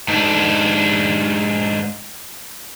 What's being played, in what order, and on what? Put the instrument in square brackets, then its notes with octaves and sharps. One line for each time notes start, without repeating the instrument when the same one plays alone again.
[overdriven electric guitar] G#2 D4